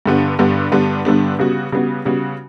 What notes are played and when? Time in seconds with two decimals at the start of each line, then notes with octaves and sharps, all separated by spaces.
0.06 G2 D3 G3 B3 D4
0.39 G2 D3 G3 B3 D4
0.72 G2 D3 G3 B3 D4
1.05 G2 D3 G3 B3 D4
1.39 C#3 G3 B3 F#4
1.72 C#3 G3 B3 F#4
2.05 C#3 G3 B3 F#4